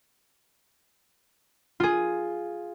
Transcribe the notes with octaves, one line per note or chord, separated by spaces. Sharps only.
F4 G#4